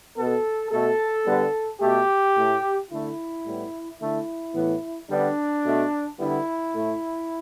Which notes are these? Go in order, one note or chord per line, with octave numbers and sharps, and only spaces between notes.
B2 B3 A4
B2 A3 A4
D3 G3 B3
B2 A3 G4
A2 A3
D3 A3 E4
A2 G3 B3
D3 A3 E4
A2 E3 B3
D3 G3 B3 D4
B2 A3
D3 G3 B3 E4
A2 A3